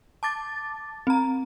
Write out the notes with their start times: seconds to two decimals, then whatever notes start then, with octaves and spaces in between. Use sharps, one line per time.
0.23 A5 D6 A6
1.07 C4 A#5